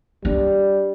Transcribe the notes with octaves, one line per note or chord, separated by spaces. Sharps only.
G3 D4